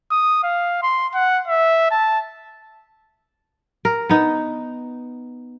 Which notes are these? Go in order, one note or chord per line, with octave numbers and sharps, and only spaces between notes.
D#6
F5
C6
F#5
E5
A5
A#4
B3 D#4